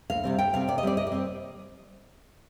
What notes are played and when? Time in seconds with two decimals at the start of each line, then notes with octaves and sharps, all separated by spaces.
0.10 D2 F5
0.24 C3 G3 C4
0.38 D2 G5
0.53 C3 G3 C4 F5
0.68 C3 D5
0.78 D#5
0.83 G3 C4 D5
0.97 C3 D#5
1.07 D5
1.12 G3 C4